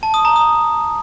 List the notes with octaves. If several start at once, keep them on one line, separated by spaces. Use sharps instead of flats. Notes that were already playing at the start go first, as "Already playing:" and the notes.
A5
D#6
A#5
D#6